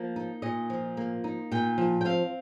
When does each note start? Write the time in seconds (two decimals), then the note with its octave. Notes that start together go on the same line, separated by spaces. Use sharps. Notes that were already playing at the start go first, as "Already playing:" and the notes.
Already playing: F3 A#3
0.16 D#4
0.42 A#2 D#5
0.70 F3
0.97 A#3
1.24 D#4
1.51 A#2 G5
1.78 F3
2.01 G5
2.05 C4 F5